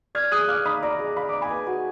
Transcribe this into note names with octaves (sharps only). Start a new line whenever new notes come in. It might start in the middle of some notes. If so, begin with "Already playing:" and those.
D5 F6 G#6
G#4 D#6 F#6
F5 D6 F6
D#4 B5 D#6
D5 A#5 D6
G#4
F5 B5
D#4 D6
G#5 B5
B4
F#4